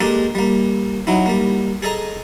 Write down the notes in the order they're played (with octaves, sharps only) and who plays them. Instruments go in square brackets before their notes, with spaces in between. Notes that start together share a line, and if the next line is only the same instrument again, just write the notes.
[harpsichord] G#3 A#3 D4 G4 A4
G3 A#3
F#3 D#4 E4
G3 A#3
G#4 A4 D#5 A#5